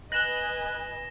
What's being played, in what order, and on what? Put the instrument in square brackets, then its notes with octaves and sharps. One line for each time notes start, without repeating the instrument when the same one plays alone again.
[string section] B4 D#5 G#5 [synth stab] F#6 [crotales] A#6 E7 G7